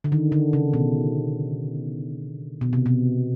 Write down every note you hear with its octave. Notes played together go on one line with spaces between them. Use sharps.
D3
D#3
D3
C#3
B2
B2
C3
B2